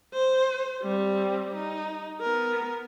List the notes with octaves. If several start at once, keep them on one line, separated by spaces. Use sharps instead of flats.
C5
G3 C4
D#4
B3 A#4